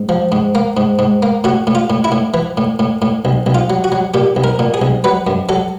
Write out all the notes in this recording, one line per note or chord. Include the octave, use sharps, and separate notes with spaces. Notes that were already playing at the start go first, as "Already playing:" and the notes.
Already playing: G#2
F3
G#2
A#3
G#2
G#2
A#3
A2 F#4
A2
F4
A2
E4
A2
E3
A2
A2
A2
B1
B1
F4
F#3
F#4
F#3
A#2 G4
B1
A#4
A#2
G#4
B1
F#3 B4
F#2
F#3 A4